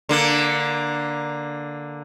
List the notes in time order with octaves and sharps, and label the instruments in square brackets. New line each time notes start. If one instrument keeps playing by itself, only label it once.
[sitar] D3 A#3